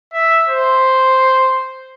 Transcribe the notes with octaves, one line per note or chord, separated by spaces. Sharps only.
E5
C5